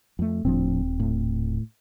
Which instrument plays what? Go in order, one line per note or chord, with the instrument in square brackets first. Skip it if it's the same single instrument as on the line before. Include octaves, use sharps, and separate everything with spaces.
[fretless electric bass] F2 A3
[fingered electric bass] D#1 C4 [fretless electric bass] A2 F3 D4
[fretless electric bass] A2